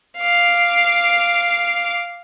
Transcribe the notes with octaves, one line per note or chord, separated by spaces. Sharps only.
F5 D6